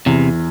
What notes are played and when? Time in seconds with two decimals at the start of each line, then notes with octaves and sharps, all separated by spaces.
0.06 E2 C3